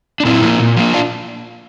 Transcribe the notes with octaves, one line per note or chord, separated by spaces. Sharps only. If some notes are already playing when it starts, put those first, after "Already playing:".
D4
A#2 C4 E4
F3 A#3
A#2
F3 A#3
D4 F4